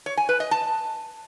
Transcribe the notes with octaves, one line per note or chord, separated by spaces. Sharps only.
C#5
G#5
B4
D#5
A5